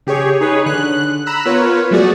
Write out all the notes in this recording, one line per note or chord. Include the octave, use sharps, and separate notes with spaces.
C#3 G4 G#4 C#5
D#4 G#4 B4 C#5
D3 F#6
A#5 B5 E6 F#6
B3 F4 A#4 B4 C#5
F#3 A3 F#4 G#4 D5